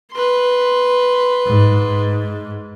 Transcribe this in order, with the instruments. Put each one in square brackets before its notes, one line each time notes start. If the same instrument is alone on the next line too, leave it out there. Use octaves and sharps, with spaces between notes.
[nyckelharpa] B4 C6
[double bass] G#2